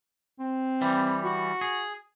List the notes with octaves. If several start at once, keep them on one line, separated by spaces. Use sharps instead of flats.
C4
E3 G3
F#4
G#4